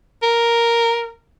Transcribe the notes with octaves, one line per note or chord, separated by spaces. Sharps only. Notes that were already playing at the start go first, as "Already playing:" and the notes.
A#4